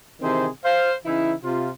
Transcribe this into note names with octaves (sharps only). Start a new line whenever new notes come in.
C3 D#3 E3 C4 G#4 C5
C5 F5
C#3 E3 D#4 E4
C3 F4